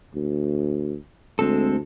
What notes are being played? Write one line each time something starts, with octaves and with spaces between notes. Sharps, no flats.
D2
D2 G#3 C4 A4